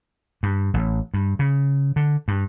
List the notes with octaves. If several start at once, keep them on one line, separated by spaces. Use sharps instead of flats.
G2
A1
G2
C#3
D3
G2